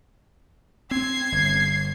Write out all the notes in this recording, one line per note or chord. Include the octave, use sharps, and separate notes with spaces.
C4 G#6 C7
G1